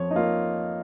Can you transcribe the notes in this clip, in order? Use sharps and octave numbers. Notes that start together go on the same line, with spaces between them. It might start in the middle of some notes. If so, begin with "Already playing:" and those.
Already playing: F2 F3 C#5
D#4
A#3 F4